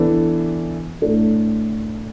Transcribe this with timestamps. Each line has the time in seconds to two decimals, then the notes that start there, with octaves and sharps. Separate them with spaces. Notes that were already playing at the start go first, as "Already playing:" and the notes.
Already playing: E3 B3 D4 A4
1.02 A2 A3 D4